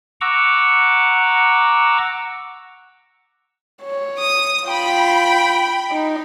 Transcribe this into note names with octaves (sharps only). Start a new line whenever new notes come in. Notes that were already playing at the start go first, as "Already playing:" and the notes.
F#5 A#5 C#6 D6 E6
C#5
D#6
F4 G5 B5
D#4